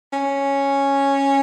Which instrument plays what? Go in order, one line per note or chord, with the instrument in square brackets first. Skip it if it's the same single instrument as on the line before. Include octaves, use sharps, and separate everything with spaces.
[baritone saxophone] C#4